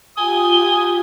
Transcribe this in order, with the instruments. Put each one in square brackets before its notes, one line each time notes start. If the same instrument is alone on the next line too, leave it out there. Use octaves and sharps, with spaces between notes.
[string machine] F4 G4 [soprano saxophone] G#5 [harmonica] D#6 [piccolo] G7